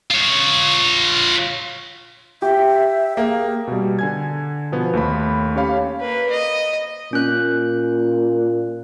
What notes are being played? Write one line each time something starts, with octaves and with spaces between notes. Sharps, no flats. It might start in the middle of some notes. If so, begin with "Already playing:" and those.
F4 C#5
G4 E5
A#3 G#4
B2 G3
D3 G#5 G#6
B2 F3 B3
D#2 A3 B5
C#4 G4 C#5 F5 B5
A#3 B4
D#5
A#2 C#4 F#6